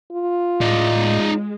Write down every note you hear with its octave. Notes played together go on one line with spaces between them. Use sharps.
F4
A2 G#3 D#4 D5